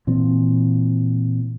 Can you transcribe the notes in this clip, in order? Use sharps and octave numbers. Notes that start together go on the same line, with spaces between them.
A#2 E3 C4